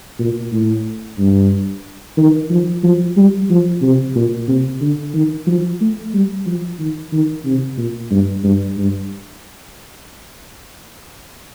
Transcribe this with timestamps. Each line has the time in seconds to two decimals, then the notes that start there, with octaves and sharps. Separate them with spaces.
0.19 A#2
0.52 A2
1.18 G2
2.17 D#3
2.50 F3
2.83 F3
3.16 G3
3.50 F3
3.82 C3
4.15 A#2
4.48 C3
4.81 D3
5.14 D#3
5.47 F3
5.80 A3
6.13 G3
6.46 F3
6.79 D#3
7.12 D#3
7.45 C3
7.77 A#2
8.11 G2
8.44 G2
8.77 G2